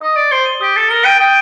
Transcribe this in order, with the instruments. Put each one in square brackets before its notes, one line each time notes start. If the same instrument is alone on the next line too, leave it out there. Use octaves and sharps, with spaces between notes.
[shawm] D#5 [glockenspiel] D#6
[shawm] D5 [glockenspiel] A6
[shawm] C5 [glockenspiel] G7
[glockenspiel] D#7
[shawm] G4 [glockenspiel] D#6
[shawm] A4 [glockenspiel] A6
[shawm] A#4 [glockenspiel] G7
[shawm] G5 [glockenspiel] D#7
[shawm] G5 [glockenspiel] D#6